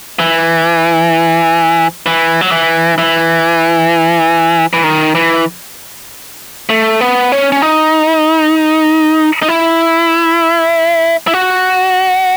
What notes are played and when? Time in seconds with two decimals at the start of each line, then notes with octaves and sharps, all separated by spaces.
0.20 E3
2.06 E3
2.41 F#3
2.51 E3
2.98 E3
4.73 E3
4.84 D#3
5.15 E3
6.69 A3
7.01 B3
7.32 C#4
7.52 C#4
7.62 D#4
9.42 D#4
9.48 E4
11.27 E4
11.33 F#4